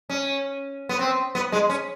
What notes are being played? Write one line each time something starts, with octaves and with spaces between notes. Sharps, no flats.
C#4
B3
C4
B3
G#3
C#4